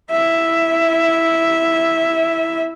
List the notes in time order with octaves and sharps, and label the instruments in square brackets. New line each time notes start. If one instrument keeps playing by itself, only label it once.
[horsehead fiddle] E4 E5